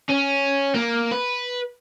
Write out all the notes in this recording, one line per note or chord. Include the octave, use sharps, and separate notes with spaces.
C#4
A#3
B4